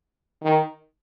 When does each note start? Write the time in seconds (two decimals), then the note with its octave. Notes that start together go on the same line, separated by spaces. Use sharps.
0.43 D#3